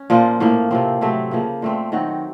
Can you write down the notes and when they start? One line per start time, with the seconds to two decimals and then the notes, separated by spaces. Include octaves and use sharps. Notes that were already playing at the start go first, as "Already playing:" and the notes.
Already playing: C#4
0.10 A#2 F3 A#3 F4
0.40 A2 F3 A#3
0.71 C3 F3 C4
1.01 C3 F#3 A3 C4
1.31 C#3 F3 A#3
1.62 A#2 A3 C4
1.92 D#3 F#3 C4 F#4